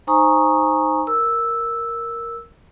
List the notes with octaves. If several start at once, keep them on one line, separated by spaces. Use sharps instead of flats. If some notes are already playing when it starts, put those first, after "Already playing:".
D#4 C5 G#5 A#5 C#6 D#6
A#4 E6